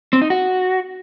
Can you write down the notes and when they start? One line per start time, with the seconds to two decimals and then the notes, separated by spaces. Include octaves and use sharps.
0.13 C4
0.22 D#4
0.30 F#4